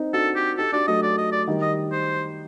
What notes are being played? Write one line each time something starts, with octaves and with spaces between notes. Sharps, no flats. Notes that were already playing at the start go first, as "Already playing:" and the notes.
Already playing: C4 D#4
D4 F#4 A4
G4
D#4 G4 A4
D4 F#4 D5
F#3 A3 D#5
D5
D#5
D5
D#3 G3
D#5
C5